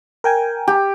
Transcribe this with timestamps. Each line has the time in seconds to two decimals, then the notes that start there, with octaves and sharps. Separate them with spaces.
0.24 A#4 G5 G#5
0.68 G4